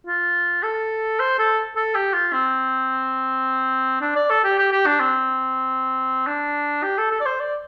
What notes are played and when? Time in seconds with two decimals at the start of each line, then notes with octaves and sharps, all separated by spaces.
0.07 F4
0.63 A4
1.20 C5
1.39 A4
1.76 A4
1.95 G4
2.14 F4
2.33 C4
4.01 D4
4.16 D5
4.30 A4
4.44 G4
4.58 G4
4.72 G4
4.86 D4
5.00 C4
6.27 D4
6.83 G4
6.98 A4
7.11 A4
7.20 D5
7.25 C5
7.39 D5